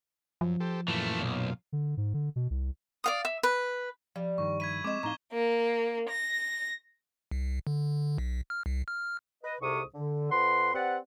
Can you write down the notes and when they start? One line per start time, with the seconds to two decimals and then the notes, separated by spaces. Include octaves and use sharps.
0.41 F#2 F3
0.60 G4 A4 C5
0.88 F#2 A#2 E3 A3 F4
1.21 B1
1.73 D3
1.97 G#2
2.14 D3
2.36 B2
2.50 C2
3.04 D5 F5 D#6
3.25 E5
3.43 B4
4.16 F3 G3
4.38 G2 D#3 C#6
4.60 E4 G#6 B6 D#7
4.84 G#3 C4 D#5 D6 E7
5.03 A2 D#4 F5 A#5 C#6 G7
5.32 A#3
6.10 A#6
7.31 C2
7.67 D3
8.18 B1
8.50 F6
8.66 C2
8.88 F6
9.43 B4 D#5
9.61 C2 G#2 C3 A4 C#6 D#6
9.94 D3
10.30 F2 B4 F#5 C6
10.74 C4 G4 B4 D5 F#5